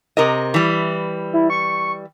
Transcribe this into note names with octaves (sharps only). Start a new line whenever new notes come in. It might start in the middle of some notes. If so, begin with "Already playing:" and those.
C3 A#4 D#5
E3 G3
E4
C#6